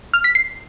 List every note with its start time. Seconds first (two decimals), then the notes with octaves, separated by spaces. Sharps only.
0.14 F6
0.24 B6
0.35 C7